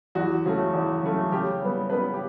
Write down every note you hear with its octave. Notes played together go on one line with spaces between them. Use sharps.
E2 F#4
C#3 F#3 A3
E2
C#3 F#3 A3
C#3 G4
G3 B3
C#3 B3 B4
G4